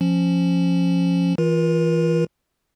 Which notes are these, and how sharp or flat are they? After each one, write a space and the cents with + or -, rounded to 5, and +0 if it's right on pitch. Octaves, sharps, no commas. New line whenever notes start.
F3 +0 C#4 -10
E3 +0 F4 +0 A#4 +40